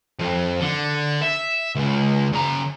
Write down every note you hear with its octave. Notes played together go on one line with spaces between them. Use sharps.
F2
D3
E5
C#2
C#3 A#5